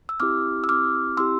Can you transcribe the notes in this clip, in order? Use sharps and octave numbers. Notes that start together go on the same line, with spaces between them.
E6
C4 E4 G4 D6 F6
E6
C4 E4 G4 D6 F6
C4 E4 G4 C6 E6